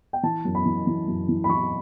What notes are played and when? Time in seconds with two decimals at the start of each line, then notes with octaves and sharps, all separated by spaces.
0.13 G5
0.23 E3 A5
0.45 F#2
0.55 B5
0.65 E3
0.87 E3
1.08 F#2
1.29 E3
1.44 B5
1.49 E3 C#6